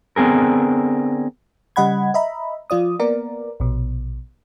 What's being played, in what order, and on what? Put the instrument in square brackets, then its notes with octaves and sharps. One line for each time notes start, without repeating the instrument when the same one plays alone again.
[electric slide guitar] D3 B3 C4 G#4 A#4
[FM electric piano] C#3 G3 D#5 F#5 B5 G#6
D#5 E5 A#5 B5
F3 F4 D5 D#6
A#3 B3 A#4 D5
A#1 B2